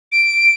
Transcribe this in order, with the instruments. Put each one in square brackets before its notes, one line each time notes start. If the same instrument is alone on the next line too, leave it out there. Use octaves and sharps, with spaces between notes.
[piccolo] D7